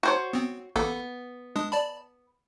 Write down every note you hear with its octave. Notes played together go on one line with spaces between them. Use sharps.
F#4 C5 C#5
B3 C4
A1 A#3 B3 A4
G#3 D4 D#6
D5 A5 B5